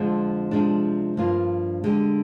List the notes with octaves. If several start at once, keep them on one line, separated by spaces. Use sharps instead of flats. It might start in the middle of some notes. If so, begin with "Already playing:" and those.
Already playing: F2 D3 F3 G#3 C4
C3 F3 G#3 D4 G4
G2 F3 A#3 D4 F4
D3 G#3 D4 G4